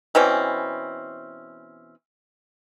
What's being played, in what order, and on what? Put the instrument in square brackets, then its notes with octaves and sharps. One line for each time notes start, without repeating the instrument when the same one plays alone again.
[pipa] B2 E3 C4 C#4